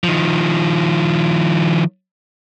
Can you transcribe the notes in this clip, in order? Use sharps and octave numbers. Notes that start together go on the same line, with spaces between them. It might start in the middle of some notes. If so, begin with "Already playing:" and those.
D#3 F3